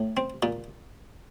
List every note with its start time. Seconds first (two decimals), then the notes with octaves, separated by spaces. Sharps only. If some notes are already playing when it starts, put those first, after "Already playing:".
Already playing: A2
0.17 C4
0.43 A#2